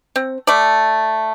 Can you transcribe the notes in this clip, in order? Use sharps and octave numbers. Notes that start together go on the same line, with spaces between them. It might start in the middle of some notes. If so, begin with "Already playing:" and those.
C4
A3 D5